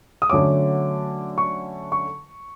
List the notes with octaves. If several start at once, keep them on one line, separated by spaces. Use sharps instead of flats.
D#6
D3 F#3 A3 C#4 D6
C#6
C#6